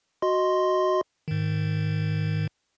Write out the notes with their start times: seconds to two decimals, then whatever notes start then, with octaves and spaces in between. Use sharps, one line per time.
0.22 F#4 D#5 C6
1.28 G#2 D#3